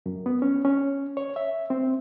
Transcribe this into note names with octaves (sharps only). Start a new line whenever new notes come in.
F#2
B3
C#4
C#4
C#5
E5
C4